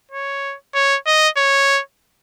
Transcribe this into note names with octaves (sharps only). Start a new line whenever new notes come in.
C#5
C#5
D#5
C#5